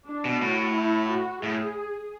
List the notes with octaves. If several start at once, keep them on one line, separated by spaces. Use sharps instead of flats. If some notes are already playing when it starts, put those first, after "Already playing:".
D4
B2
A2 F#4
E4
F#4
A2 G#4